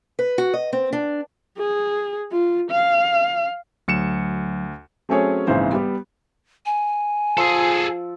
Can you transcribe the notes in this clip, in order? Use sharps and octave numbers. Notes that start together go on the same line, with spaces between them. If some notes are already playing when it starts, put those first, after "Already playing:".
B4
F#4
D#5
C4
D4
G#4
F4
F5
D2 F#3 C#7 E7
F#3 A3 C4 C#4 G#4 C#5
A#1 G#2 C#3 E3 C4 C5
G3 B3 G4
G#5
F3 G#4 A4 E6